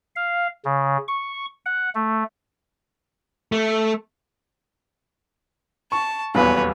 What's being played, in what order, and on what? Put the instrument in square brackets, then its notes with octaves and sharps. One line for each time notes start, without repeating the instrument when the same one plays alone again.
[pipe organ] F5
C#3
C#6
F#5
A3
[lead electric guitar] A3
[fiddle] A5 [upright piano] C#6
[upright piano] D#1 B1 E2 [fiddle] B4 C#5